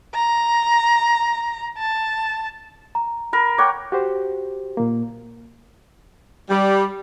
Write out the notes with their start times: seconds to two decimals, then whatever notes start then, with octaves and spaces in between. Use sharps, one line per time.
0.15 A#5
1.78 A5
2.95 A#5
3.33 A#4 B5
3.58 C#5 F#5 G5 D6
3.92 F#4 G4 C5
4.77 A#2 A#3
6.49 G3